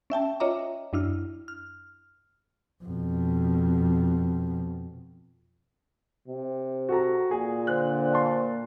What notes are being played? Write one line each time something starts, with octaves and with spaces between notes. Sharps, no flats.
C#4 E5 G5 A5
F4 C#5 D#5 E5 A#5 D6
F#2 D4 E4 F6
F6
F2 B2
C3
F#4 A4 A#5
A#2 G#4
D3 C5 F#6
F5 A5 C6